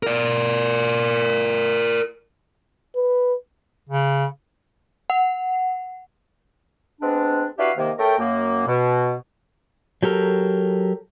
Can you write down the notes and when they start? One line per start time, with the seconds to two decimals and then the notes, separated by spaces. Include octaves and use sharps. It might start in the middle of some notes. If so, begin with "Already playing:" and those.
0.03 A#4 D5
2.96 B4
3.89 C#3
5.10 F#5
7.01 G#3 B3 C4 D4
7.58 D4 E4 F#4 G4 B4 F5
7.78 C3 D#3 A#3
7.99 A3 C#4 A4 A#4 G5
8.19 F#2 A#3
8.66 B2
10.03 F#3 G4 A4 A#4